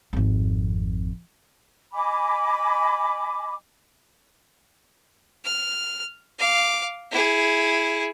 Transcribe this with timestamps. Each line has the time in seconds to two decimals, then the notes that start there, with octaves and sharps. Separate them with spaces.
0.13 G#1 F2
1.94 D#5 G#5 B5 D6
5.44 F6
6.39 F5 D6
7.12 E4 G#4